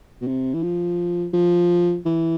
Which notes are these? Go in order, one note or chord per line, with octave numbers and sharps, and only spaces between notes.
B2
C3
E3
F3
F3
E3